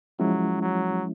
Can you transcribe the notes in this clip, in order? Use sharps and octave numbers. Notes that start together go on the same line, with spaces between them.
F3 F#3 G#3 C#4 E4
F#3